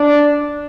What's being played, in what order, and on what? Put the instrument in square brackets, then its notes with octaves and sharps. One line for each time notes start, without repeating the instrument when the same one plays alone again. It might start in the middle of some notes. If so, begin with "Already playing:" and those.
Already playing: [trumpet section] D4